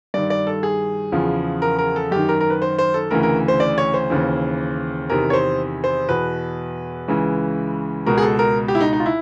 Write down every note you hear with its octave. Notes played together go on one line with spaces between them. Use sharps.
G2 D#3 D5
D5
A4
G#4
E2 C#3 F3
A#4
A#4
A4
F#2 D#3 G4
A#4
A#4
B4
C5
C5
A4
D2 C#3 E3 A#4
A#4
C5
D5
C#5
C5
D#2 C#3 E3
E2 C3 D#3 A#4
C#5
C5
C5
E2 B2 B4
C#2 C#3 E3
C#2 B2 A#4
G#4
A4
A#4
G4
E4
D#4
D#4
F4
E4